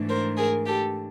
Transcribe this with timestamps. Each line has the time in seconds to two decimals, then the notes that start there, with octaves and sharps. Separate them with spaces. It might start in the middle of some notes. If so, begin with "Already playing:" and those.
Already playing: G#2 E3 A3 D4
0.09 A#4 C5
0.38 G#4 A#4
0.67 G4 A4